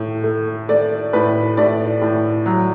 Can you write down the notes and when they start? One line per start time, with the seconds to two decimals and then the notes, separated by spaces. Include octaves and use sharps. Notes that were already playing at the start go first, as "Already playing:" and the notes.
Already playing: A2 A3
0.24 A3
0.69 A3 D5
1.13 A2 B4
1.57 A2 D5
2.02 A2
2.46 F#3